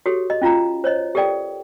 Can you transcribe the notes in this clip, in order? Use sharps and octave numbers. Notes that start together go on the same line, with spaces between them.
F#4 G4 A4 C#5
D#5
C#4 F4 F5 A#5
C5 C#5 D#5
G4 A4 A#4 D5 G5